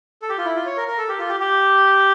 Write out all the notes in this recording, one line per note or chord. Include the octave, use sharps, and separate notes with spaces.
A4
G4
F4
E4
F4
C#5
A#4
A#4
A4
G4
F4
G4
G4